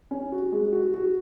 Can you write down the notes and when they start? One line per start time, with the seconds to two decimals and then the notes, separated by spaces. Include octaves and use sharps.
0.11 C#4
0.32 F#4
0.52 G#3
0.73 F#4
0.94 F#4